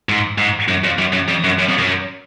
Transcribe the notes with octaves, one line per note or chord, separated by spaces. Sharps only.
G#2
G#2
F#2
F2
F#2
F#2
F2
F#2
F#2
F2
F#2